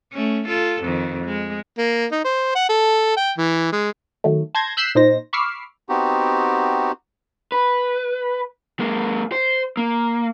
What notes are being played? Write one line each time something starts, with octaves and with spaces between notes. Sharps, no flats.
A3 C#4
F4 A4
F2 D#3
G#3
A#3
D#4
C5
F#5
A4
G5
E3
G#3
D#3 F#3 A3
A5 C6 G6 G#6 A#6
E6 F#6 G6 B6 C7 E7
A#2 D#4 C5 A#6
B5 C#6 D6 E6 F6 C7
B3 C4 D#4 F#4 G4
B4
G#3 A#3
C5
A#3